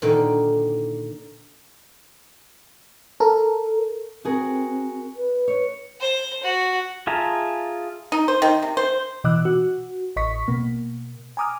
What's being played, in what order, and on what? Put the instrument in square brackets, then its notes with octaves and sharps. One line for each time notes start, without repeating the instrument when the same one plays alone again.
[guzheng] A#2 D3 D#3
[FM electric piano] A4 A#4
[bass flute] C4 [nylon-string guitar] F#4 G#4 A#4
[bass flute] B4
[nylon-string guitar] C#5
[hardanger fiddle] C5
F#4
[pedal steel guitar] F4 G#4 E5 A5 A#5
[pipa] D#4
C5
D#3
C3
C5
[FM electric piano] B2 E3 D#5 D6 E6 F#6
F#4
A1 D#5 C#6 B6
B2 A#3
G#5 A#5 D6 D#6 F6